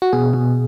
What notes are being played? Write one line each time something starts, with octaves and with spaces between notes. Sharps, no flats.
F#4
B2 G#4
B2